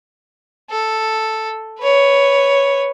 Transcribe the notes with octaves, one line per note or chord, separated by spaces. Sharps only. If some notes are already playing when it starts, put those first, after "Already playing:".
A4
B4 C#5